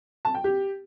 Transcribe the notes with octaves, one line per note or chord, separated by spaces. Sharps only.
A5
G5
G4